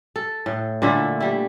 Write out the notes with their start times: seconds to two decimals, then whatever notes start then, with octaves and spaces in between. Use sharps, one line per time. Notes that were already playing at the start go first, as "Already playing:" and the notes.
0.16 A4
0.46 A2
0.82 A#2 D3 A3 E4
1.20 G3 E4